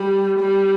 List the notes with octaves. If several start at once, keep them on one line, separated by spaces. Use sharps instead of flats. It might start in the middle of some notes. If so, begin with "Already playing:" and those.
Already playing: G3
G3